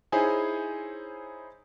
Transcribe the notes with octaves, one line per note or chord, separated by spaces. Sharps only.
D#4 E4 G#4 C5 C#5 G#5